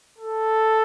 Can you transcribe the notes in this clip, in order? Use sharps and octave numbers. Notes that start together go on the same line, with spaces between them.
A4